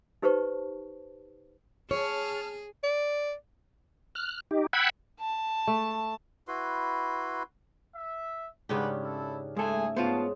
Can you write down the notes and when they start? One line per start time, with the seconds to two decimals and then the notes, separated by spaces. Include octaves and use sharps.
0.22 D#4 G4 B4 C5 A5 C#6
1.91 G#4 C#5 A5 F6
2.84 D5
4.15 F6 F#6
4.51 D#4 G4
4.73 F#5 G5 B5 E6 F#6 G#6
5.20 A5
5.67 A3
6.48 E4 F#4 B4 C6
7.95 E5
8.69 G#2 C#3 C#4 D4 G4 B4 F#5
9.01 E4 A4
9.57 G#3 A3 G#4 A4 E5 G#5
9.96 G#2 C#3 B3 F4 F#4 C5 A5